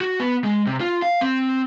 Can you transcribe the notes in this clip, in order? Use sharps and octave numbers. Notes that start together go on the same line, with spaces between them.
F#4
B3
G#3
C3
F4
F5
C4